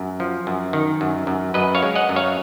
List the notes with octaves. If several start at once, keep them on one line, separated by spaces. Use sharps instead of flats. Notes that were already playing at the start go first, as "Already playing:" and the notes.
Already playing: F#2
F3
F#2
D#3
F#2
F#2
F#2 B4 D#5
C#5 F5
G#3
D#5 F#5
F#2
C#5 F5